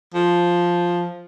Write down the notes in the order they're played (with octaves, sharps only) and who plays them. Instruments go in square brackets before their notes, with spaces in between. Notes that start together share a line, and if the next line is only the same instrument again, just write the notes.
[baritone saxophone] F3